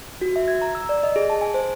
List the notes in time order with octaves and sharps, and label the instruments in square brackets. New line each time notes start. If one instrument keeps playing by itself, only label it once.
[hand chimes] F#4
E5
G#6
A#5
E6
D5
D#5
G#4
A5
G#5
C5